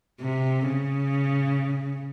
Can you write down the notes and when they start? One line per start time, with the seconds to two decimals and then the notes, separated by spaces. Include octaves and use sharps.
0.21 C3
0.67 C#3